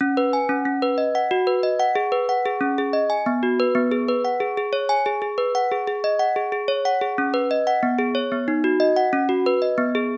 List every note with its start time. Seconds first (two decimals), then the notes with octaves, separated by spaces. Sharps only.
0.01 C#4
0.17 B4
0.33 G#5
0.49 C#4
0.65 C#4
0.82 B4
0.98 D#5
1.15 F#5
1.31 F#4
1.47 B4
1.63 D#5
1.80 F#5
1.95 G#4
2.12 B4
2.29 F#5
2.46 G#4
2.61 C#4
2.78 G#4
2.93 D#5
3.10 G#5
3.26 B3
3.43 F#4
3.60 B4
3.75 B3
3.92 G#4
4.08 B4
4.25 F#5
4.40 G#4
4.57 G#4
4.73 C#5
4.89 G#5
5.06 G#4
5.22 G#4
5.38 B4
5.55 F#5
5.72 G#4
5.87 G#4
6.04 D#5
6.19 F#5
6.36 G#4
6.52 G#4
6.68 C#5
6.85 F#5
7.01 G#4
7.18 C#4
7.34 B4
7.51 D#5
7.67 F#5
7.83 B3
7.98 G#4
8.15 C#5
8.32 B3
8.48 D#4
8.64 F#4
8.80 D#5
8.96 F#5
9.13 C#4
9.29 F#4
9.46 B4
9.62 D#5
9.78 B3
9.95 G#4